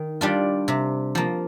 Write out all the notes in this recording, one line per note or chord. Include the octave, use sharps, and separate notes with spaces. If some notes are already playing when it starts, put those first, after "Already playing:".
Already playing: D#3
G3 D4 F4
C3
F3 A#3